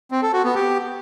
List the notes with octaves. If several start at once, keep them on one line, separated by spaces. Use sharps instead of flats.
C4
A4
F#4
B3
G4